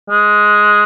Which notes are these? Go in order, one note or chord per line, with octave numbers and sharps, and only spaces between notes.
G#3